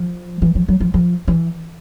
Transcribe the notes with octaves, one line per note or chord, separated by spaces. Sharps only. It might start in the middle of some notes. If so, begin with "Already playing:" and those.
Already playing: F3
E3
F3
F#3
F3
F3
E3